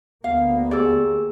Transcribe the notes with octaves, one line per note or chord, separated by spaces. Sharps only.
D2 A#3 B3 F5
G4 G#4 D5 E6